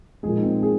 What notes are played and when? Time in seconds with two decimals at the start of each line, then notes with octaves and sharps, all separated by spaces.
0.23 A#2 F3 G#3 G#4
0.37 D#4
0.43 C4
0.63 G#4